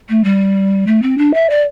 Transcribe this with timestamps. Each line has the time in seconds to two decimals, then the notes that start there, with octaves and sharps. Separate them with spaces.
0.09 A3
0.24 G3
0.86 A3
1.02 C4
1.17 D4
1.33 E5
1.49 D5